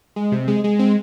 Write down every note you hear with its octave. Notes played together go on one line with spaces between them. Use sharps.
G#3
C3
G#3
G#3
C4